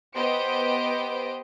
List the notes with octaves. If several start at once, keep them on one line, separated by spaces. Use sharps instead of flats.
B3 G4 C5 D#5 D7